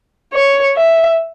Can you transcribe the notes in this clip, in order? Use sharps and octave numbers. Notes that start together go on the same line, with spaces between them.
C#5
E5